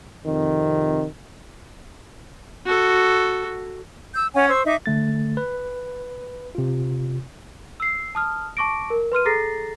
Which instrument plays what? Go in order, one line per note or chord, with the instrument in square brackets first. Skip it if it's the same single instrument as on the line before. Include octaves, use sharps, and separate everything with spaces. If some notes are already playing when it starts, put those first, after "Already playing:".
[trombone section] F2 C3 D#3
[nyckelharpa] F#4 A4
[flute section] E6 G6
C#4 C#5 F#5 G#5
C5 C#6 E6
D#4 E5 D6
[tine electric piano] D3 A3 A6
B4
C3 F4
[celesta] E6 C7
A5 D#6 F6
A5 C#6 D6 A#6 D7
A#4
B4 C6 F6 D#7
G#4 A4 A#5 A6 A#6 C7